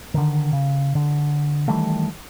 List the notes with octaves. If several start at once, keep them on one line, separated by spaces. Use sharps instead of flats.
D3 D#3
C#3
D3
D#3 E3 G3 A3